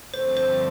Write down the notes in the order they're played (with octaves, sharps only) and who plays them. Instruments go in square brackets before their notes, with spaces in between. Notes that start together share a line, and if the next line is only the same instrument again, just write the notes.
[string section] G2 D3 F3 A3 C4 [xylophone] C5
[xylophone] C5